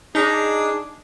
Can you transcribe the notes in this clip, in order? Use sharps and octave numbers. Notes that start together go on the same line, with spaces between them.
D4 D#4 G#4